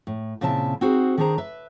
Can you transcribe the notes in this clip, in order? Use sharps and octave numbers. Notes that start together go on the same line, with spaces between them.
A2
A#2 C#3 C4 E4 E5 A5
C4 D#4 F#4 G#4 C5
D#3 D4 G#4 C5 A#5
B4 E5